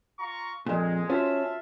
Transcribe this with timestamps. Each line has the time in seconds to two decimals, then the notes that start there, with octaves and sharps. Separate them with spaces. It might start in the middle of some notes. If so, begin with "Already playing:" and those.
0.18 F4 A#5 C#6
0.66 F2 A#2 G#3 D4 A4 D#5
1.10 C#4 F4 F#4 C5 E5 F5 A5